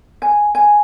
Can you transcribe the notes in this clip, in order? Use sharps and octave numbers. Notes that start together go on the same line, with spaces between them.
G#5
G#5